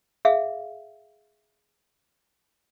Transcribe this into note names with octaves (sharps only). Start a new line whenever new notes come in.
G#4 E5 F5